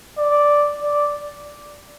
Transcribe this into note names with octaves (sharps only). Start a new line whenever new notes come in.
D5
D5